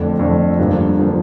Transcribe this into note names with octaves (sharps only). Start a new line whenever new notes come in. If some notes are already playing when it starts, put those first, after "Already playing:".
Already playing: F2 D3 A3 D4
F2 D3 A3 D4
G2 D3 F3 A#3
D3 F3 A#3